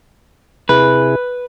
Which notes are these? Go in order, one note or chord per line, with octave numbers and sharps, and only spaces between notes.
C3 E4 G#4 B4